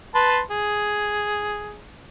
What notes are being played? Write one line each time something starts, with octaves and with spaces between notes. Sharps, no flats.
B4 A5 C6
G#4